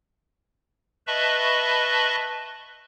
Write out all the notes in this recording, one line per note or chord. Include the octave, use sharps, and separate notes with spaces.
B4 D#5 E5 A5 B5 C#6